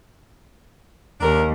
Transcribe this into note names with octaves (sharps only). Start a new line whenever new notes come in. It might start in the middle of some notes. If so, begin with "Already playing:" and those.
D#2 D4 A#4